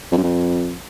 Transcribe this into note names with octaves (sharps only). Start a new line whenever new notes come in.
F2
F#2
F2